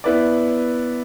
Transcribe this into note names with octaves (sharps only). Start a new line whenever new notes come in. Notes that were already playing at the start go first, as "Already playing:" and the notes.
B3 E4 B4 D5